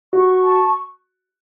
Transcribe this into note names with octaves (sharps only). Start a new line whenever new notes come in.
F#4 C#6
A5